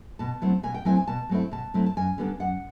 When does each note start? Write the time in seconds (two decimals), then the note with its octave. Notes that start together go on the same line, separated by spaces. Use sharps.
0.19 B2 A5
0.42 F#3 A3 C4 E4
0.63 B2 G#5
0.74 G5
0.85 F#3 A3 C4 E4 G#5
0.97 G#5
1.08 B2 A5
1.29 F#3 A3 C4 E4
1.52 B2 A5
1.74 F#3 A3 C4 E4
1.86 A5
1.97 F#2 G#5
2.18 D3 G3 B3 D4
2.40 F#2 F#5